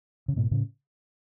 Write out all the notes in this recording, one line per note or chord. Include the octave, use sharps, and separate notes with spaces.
C#3
G#2 B2
A2 C#3